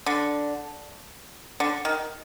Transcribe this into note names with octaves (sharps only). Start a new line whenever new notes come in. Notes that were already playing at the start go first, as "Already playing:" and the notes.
D3
D3
D#3